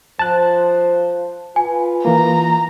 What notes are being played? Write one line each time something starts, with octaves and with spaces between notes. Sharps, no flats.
F3 C5 A5 F#6
F4 B4 G#5
E3 A#3 A#5